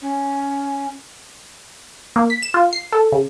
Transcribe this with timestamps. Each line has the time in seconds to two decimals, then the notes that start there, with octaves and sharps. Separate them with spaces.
0.02 C#4
2.16 A#3
2.30 B6
2.42 E7
2.54 F4
2.73 C7
2.92 A4
3.12 C#3